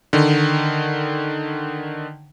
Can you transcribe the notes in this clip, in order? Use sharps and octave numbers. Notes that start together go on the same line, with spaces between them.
D3 D#3